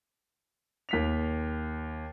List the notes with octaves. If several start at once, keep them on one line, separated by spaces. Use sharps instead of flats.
D#2 B6 F7